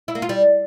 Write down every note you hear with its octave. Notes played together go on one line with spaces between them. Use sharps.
E4
A#3
F4
G3